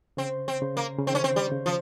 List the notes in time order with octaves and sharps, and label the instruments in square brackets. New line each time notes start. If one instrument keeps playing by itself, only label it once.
[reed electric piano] C#3 [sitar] C4
[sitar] C4
[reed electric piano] C#3
[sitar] A#3
[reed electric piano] C#3
[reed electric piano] D#3 [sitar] C4
[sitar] C#4
C4
G3
[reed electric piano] C#3
[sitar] F3